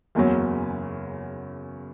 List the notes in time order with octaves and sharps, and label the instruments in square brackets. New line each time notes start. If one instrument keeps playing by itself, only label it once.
[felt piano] F#1 E2 C#3 F#3 C#4